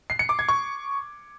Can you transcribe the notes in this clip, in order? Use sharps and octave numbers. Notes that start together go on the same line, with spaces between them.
C7
C#7
D6
G#6
C#6